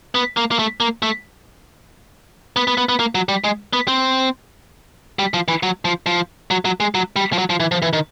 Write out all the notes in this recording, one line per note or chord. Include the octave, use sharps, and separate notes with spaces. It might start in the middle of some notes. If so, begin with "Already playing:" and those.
B3
A#3
A#3
A3
A#3
A3
B3
B3
B3
B3
A#3
F#3
G3
G#3
B3
C4
G3
F3
E3
F#3
F3
F3
F#3
F#3
G#3
F#3
G3
F3
F#3
F3
E3
F3
E3
D#3